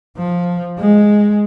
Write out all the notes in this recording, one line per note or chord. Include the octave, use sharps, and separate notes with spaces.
F3
G#3